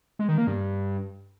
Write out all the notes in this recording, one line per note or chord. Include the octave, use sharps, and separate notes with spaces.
G#3
D#3
A#3
G2